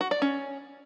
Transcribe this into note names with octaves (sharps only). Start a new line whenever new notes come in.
F#4
D5
C#4